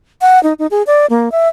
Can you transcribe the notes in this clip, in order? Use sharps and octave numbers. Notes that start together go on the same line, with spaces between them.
F#5
D#4
D#4
G#4
D5
A#3
E5